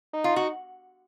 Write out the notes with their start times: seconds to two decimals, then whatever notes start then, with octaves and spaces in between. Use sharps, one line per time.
0.13 D#4
0.24 F4
0.36 F#4